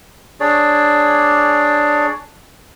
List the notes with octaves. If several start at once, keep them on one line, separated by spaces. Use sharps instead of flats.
D4 G#4 C#5 D5